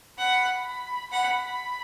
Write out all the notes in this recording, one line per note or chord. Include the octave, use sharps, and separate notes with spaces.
F#5 B5
B5
F#5 B5